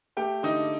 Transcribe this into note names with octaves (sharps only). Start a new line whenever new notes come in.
A3 G4 G5
D3 D#4 D#5